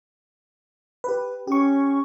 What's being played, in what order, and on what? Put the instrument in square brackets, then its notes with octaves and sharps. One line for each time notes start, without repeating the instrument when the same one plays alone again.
[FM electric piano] G4 B4
[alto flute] C#4 [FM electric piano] G4 C#6